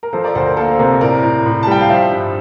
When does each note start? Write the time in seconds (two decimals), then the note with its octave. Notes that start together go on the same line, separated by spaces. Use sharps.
0.03 A#4
0.13 F3 A4 C5
0.24 A#4 D5
0.35 D2 A4 C5
0.46 A#4
0.57 A#3 A4
0.68 C5
0.79 C3 A#4
1.01 A2 A#4 D5
1.23 A2
1.46 A2
1.63 A5
1.67 G3 G5
1.81 F5
1.89 F3 C5 E5
2.11 G2